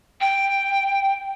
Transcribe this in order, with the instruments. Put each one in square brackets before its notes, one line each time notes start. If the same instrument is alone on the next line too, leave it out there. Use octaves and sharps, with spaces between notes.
[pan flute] G5